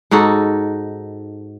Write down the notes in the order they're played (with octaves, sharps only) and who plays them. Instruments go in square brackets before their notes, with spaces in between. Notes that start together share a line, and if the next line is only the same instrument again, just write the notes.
[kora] G#2 D#4 F#4 A4